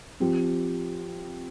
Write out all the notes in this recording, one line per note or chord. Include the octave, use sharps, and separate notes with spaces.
F3 C4 G4